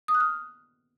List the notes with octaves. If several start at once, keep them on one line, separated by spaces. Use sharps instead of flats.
D#6
F#6
F6